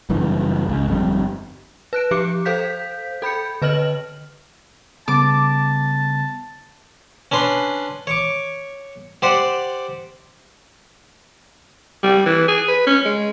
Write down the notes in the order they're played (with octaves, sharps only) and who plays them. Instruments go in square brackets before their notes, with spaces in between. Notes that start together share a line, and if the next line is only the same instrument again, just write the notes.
[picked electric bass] F#1 G2 E3
C#2
G1 F2 A2 G3
[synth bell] B4 F#6 D7
F3 G4 D6 C#7
A4 C5 F5 G6 B6
A4 B5 G6 C#7
D3 B4 D#5 F6 F#7
[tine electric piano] C#3 G3 B3 [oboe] A5 [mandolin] D6
[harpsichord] C#4 D4 B4 C6
C#5 C#6 D6
G4 C5 D5 F#5
[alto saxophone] G3
E3
G#4
B4
C#4
G#3